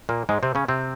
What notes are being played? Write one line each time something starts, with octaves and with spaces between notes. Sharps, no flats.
A#2 A#3
G#2 G#3
C3 C4
C#3 C#4
C3 C4